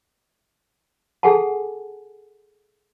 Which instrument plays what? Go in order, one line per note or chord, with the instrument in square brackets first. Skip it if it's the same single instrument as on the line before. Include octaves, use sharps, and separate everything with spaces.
[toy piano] G#4 A4 F#5 G#5 A5